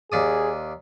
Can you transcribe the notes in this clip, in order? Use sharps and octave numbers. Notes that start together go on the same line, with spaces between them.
D#2 G#4 D5 D#6